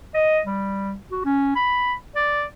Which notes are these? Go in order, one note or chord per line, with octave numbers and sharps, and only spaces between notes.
D#5
G3
F#4
C#4
B5
D5